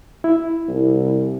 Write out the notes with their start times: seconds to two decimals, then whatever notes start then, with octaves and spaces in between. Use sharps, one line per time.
0.24 E4
0.69 C2